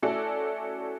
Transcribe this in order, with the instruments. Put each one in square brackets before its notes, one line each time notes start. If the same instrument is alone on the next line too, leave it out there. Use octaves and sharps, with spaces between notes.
[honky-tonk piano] A3 C#4 E4 F#4 A4 D5